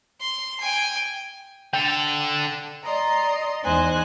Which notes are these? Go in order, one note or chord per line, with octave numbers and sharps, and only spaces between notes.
C6
G5 G#5
D3 A4 G5
D5 D#5 A#5 C6
E2 D#4 C5 G#5 F#6